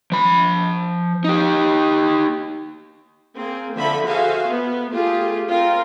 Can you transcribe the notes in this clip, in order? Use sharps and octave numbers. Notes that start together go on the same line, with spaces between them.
F3 B5
D#4 G4
A#3 C4 G#4
D3 F3 A4 E5 B5
F#4 G#4 A4 C5 E5 F5
B3
A3 F4 G4 G#4
C4 F4 A#4